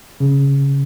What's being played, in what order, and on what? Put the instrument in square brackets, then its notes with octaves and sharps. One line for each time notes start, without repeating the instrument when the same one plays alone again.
[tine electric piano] C#3